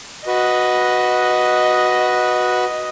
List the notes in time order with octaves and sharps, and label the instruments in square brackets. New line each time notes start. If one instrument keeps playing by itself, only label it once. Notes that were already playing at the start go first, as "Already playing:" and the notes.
[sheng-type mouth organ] F#4 B4 [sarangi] D#5